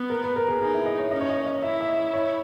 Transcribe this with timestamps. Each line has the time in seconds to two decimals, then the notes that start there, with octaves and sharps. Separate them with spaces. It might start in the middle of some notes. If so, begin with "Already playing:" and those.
Already playing: B3
0.10 A#4
0.24 B4
0.36 A#4
0.48 G#4
0.61 D#4 G#4
0.74 E4
0.86 D#5
0.99 C#5
1.11 C#4 D#5
1.21 C#5
1.29 D#5
1.46 D#5
1.62 E4 E5
1.81 E5
1.88 D#5
2.13 C#5